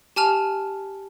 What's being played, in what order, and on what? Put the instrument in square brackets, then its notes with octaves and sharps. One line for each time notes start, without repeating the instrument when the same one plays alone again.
[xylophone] G4 G#5 A5 F6 F7